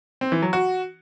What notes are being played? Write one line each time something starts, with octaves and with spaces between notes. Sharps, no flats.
C4
E3
F#3
F#4